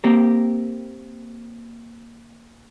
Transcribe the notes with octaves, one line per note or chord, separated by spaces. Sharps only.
A#3 C4 G4 A#4